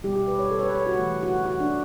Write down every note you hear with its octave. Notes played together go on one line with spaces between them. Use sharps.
B2 G3 G4
G4
B4
C#5
A4
C#5
B4
C#5
F#4
C#3 E3 A3
F#4
F#4
D4